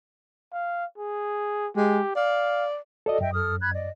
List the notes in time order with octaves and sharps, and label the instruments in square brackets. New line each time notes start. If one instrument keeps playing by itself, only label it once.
[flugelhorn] F5
G#4
[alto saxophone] G#3 [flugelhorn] G4
[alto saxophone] D5 [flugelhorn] F5
[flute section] F#4 [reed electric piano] A4 D5 D#5
[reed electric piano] F#2 [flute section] D#5 E5 G5
[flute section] A4 D#6 F6
B5 F#6 G#6
D5 D#5